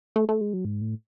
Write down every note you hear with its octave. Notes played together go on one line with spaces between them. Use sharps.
A3
A3
G#3
F#3
G#2
A2